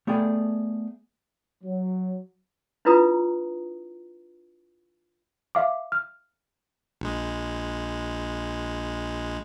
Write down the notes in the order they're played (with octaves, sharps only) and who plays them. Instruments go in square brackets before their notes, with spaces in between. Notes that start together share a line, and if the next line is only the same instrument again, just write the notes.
[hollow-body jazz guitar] A3 B3 G#4 D5 G5
[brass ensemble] F#3
[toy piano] D4 E4 F4 B4 A#5 D#6
[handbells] E5 F5 D6
F6
[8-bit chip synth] A#1 G#3